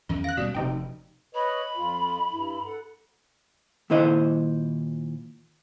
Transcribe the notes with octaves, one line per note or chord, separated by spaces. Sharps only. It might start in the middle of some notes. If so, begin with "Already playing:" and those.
E2 D#3 C#4
F5 F#6 A#6
B2 G3 A#3 F#4 D5
F1 C3 D#4 G5
B4 C#5 D#5 B5
F2 F4
G2 E4
A4 F#5
A#2 D#3 E4 C5 D#5